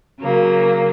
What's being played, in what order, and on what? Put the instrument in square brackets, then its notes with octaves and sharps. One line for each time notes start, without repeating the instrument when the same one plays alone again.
[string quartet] C#3 F#3 A#3